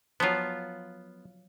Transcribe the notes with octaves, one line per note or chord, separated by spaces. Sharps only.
F3 F#3 B3 F4